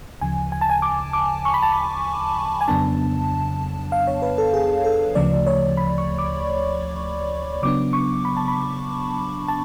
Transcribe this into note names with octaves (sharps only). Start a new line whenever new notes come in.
D2 C#3 F3 G#5
G#5
A5
G#5
D6
D6
C#6
B5
A5
B5
G#5
F2 C#3 F#3 B3 D4 A5
F5
C#5
B4
A4
G#4
A4
D2 C#3 F3 A3 D5
C#5
B5
C#6
D6
C#3 F#3 B3 D4 D6
C#6
B5
A5
B5
A5